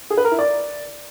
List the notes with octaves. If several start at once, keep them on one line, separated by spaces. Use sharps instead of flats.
G#4
B4
A#4
E4
D5